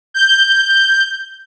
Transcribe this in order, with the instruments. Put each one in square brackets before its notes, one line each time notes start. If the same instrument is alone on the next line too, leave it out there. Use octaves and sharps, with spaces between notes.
[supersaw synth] G6